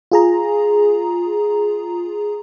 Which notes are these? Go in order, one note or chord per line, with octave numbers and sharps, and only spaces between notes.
F4 G#4 A#5